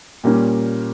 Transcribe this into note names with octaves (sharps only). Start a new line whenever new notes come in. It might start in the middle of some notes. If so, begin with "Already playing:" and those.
A#2 G3 A#3 C#4